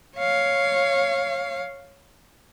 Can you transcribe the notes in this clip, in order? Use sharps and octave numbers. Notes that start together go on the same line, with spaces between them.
C#5 F5